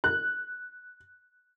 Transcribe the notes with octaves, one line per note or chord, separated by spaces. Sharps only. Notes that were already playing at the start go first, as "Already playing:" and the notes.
F#6